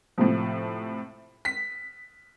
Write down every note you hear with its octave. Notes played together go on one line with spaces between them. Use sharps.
A2 C3 F3
B6